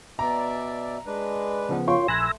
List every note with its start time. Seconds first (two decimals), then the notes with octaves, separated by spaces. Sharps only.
0.19 B2 D5 E5 A#5
1.07 G#3 D4 B4
1.69 C#3 F3 B3
1.88 F#2 F4 C#5 G5 C6
2.08 A#1 A3 G#5 B5 E6 F#6 A#6